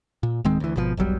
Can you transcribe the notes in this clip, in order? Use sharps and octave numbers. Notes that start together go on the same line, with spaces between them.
A#2
D1 D#3 G#3 C4
D2 E3
G#1 B2 F3
E1 B1 F#3 G3